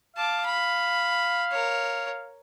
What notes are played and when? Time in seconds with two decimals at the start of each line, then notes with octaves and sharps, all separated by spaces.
0.16 F5 A5 D6
0.46 B5
1.51 A#4 C#5